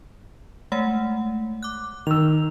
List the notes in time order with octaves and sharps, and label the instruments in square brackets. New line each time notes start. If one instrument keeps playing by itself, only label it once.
[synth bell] G#3 A3 F#5
D6 F#6
[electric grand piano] D#3 E6 [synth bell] F7